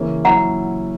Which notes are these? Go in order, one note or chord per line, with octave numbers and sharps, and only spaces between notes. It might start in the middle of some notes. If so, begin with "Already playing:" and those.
Already playing: C#3 E3 A#3 C#4
A#2 F#3 C#4 E4 F#5 A#5